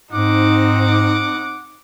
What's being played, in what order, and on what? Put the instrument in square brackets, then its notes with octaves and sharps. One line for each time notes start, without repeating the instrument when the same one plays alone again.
[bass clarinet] G#2 [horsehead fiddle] C4 D#4 [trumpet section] F#5 D6